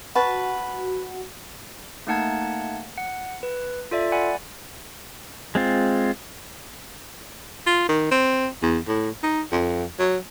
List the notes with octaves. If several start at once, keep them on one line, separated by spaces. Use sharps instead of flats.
F#4 B4 A5
A3 A#3 D#4 F#5 A5 G#6
F#5
B4
F4 A4 D5 E5
D5 F#5 G#5 B5
G#3 C4 F4
F4
D#3
C4
E2
A2
D#4
F2
F#3